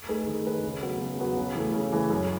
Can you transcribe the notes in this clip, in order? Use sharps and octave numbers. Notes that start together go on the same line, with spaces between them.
A3 D#4 G#4 B4
D#3
A3 D#4 G#4 B4
C#3
F#3 B3 F#4
C#3
F#3 B3 F#4
C#3
E3 A3
C#3
E3 A3
F#2